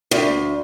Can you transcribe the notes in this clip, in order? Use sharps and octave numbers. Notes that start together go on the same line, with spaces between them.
D2